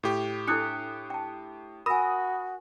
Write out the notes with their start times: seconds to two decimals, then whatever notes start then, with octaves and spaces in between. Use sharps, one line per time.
0.03 A2 G4
0.48 D4 E4 A4 D#6 F#6 C#7
1.10 G5 A5
1.86 F#4 A#4 G#5 B5 D#6 A#6